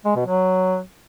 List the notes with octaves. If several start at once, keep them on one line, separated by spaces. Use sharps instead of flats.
G#3
B2
F#3